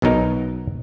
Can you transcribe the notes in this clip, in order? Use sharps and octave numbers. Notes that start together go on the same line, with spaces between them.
B1 B2 F#3 D#4 A#4